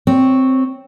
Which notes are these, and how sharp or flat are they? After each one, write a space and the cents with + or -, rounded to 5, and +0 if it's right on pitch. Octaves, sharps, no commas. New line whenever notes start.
C4 +0 C#5 +0